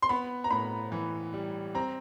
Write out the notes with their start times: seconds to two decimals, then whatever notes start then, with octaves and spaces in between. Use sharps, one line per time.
0.02 C6
0.09 B3 B5
0.44 A#5
0.50 A2 B5
0.92 E3
1.34 G3
1.75 C4 A#5